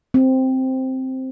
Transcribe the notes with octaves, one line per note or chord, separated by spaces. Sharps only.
C4